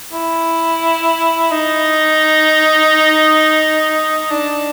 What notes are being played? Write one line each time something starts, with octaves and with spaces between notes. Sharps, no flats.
E4
D#4
D4